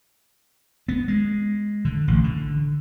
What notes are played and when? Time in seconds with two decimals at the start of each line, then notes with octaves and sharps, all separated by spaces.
0.89 B3
1.08 G#3
1.85 D3
2.08 A1
2.24 D3